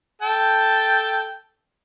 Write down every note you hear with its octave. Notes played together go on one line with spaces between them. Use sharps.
A4 G5 A5